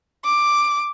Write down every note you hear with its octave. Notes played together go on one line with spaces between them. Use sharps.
D6